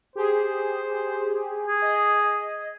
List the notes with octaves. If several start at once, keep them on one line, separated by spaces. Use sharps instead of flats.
G4 G#4 C5
G#4
D#5